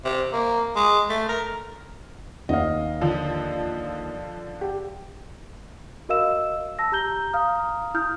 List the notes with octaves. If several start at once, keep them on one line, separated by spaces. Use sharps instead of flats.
C3
A#3
G#3
A3
A#4
D#2 D#5 F5
D3 F3
G4
F#4 A#4 D#5 F5 E6 E7
A5 E6 A#6
G4 A#5 G6 G7
F5 A#5 D#6 F6
E4 D#6 F6 G6